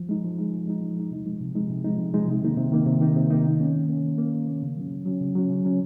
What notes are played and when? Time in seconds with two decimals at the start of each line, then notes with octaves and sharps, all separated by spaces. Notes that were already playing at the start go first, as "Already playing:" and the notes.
Already playing: F3
0.09 G#3 D#4
0.24 F3
0.38 G#3 D#4
0.53 F3
0.68 G#3 D#4
0.82 F3
0.97 G#3 D#4
1.11 C3
1.26 F3 G#3 D#4
1.41 C3
1.55 F3 G#3 D#4
1.70 C3
1.85 F3 G#3 D#4
1.99 C3
2.14 F3 G#3 D#4
2.28 C3
2.42 D#3 A#3 D#4
2.57 C3
2.72 D#3 A#3 D#4
2.86 C3
3.01 D#3 A#3 D#4
3.16 C3
3.30 D#3 A#3 D#4
3.45 D#3
3.60 A#3 C#4
3.75 D#3
3.89 A#3 C#4
4.04 D#3
4.18 A#3 C#4
4.33 D#3
4.48 A#3 C#4
4.63 C#3
4.77 F#3 C#4
4.91 C#3
5.06 F#3 C#4
5.21 C#3
5.35 F#3 C#4
5.50 C#3
5.65 F#3 C#4